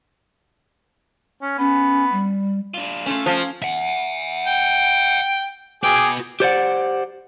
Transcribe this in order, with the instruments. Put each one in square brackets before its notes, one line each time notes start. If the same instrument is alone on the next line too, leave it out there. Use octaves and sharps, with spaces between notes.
[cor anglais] C#4
[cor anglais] B3 [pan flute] C#4
[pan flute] G3
[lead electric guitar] D4 F4
[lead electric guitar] A3 [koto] C#4 F4
[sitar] F3 [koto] G#5
[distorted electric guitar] E5 F#5
[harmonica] G5
[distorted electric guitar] F#4 B4 [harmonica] G#4 G5 D6
[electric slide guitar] G4 C5 D5 F#5